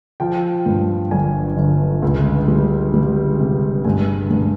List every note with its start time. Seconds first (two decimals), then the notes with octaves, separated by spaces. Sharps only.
0.20 F3 G5
0.66 G2
1.11 G1 G#5
1.57 G1
2.02 C#2
2.48 G3
2.94 G3
3.40 C3
3.85 G2 G#5
4.30 G2